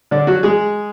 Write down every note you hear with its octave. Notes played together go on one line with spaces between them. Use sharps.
D3 D4
F#3 F#4
G#3 G#4